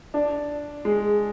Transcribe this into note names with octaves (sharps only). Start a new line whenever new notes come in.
D4
G#3